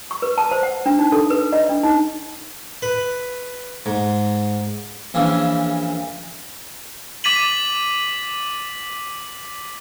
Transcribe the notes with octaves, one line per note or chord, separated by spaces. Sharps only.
C#6
B4
A5
C5
F#5
D4
D#4
A4
B4
D#5
D4
D#4
B4
G#2
A#1 C#3 E3
D6 A6 B6 D#7 F#7